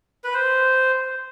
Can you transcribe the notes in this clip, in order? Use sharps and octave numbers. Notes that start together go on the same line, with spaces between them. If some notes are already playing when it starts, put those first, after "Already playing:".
B4
C5